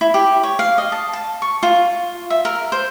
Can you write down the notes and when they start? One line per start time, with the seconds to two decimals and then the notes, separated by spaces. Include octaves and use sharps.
0.01 E4
0.14 G4
0.43 C#5
0.59 F5
0.78 D#5
0.92 A5
1.13 A5
1.42 C#6
1.63 F4
2.30 E5
2.45 A#4
2.72 C5